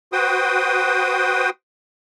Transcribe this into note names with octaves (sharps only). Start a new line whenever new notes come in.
F#4 B4 C5 G5 D#6